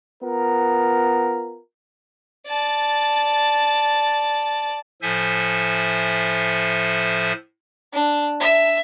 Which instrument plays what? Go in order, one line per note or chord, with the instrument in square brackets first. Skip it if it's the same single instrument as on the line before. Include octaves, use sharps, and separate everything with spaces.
[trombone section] B3 F4 A#4
[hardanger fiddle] D5 A5
[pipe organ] A2 F3 A4 C5 E5 G#5
[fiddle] D4
E5